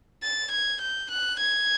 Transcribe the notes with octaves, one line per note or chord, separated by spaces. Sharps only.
A6
G#6
G6
F#6
G#6